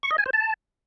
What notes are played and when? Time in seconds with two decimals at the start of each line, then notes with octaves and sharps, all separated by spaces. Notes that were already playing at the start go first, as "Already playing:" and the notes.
0.03 C#6
0.11 D#5
0.18 G#5
0.26 C5
0.33 A5